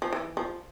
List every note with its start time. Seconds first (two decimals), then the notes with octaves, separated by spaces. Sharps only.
0.02 F3
0.13 E3
0.37 F3